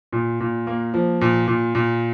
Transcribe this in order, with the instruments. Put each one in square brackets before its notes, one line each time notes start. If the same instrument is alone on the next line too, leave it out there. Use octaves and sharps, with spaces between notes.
[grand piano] A#2
A#2
A#3
F3
A#2
A#2
A#2